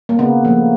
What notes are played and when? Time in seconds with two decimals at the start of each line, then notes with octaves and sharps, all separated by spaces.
0.09 A#3
0.19 C#3 B3
0.45 F3 A3 A#3